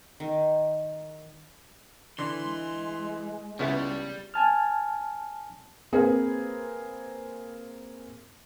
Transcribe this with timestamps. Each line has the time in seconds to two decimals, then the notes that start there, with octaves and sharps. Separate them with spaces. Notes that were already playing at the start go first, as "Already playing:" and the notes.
0.20 D#3
2.19 D3 E3 C6
2.43 G#3
3.59 C#2 C#3 G3 B3 E4 D5
4.34 G#5 A5 F6
5.93 A#3 C4 G#4 B4